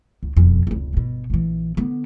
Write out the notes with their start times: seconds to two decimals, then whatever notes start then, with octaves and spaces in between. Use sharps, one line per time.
0.23 C#2
0.37 E1 F2
0.67 F1 C#2
0.93 G1 B2
1.30 A#1 E3
1.77 D3 B3